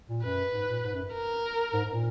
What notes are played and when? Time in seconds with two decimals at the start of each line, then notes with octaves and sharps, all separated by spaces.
0.09 A#2
0.23 F#2 B4
0.53 G#2
0.68 A#2
0.84 G#2
0.94 F#2
1.14 A#4
1.73 G#2
1.84 G#2
1.93 A#2